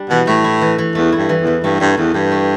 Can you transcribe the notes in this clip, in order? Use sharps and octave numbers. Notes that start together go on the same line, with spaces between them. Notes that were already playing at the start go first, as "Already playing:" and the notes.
Already playing: G3 D4
B2 E3
A2 A3
E4
E3
E3
E2 A3
E4
G2
E3
E2
E3
G2 A3
G2 D4
E2 E3
G2 G4
A3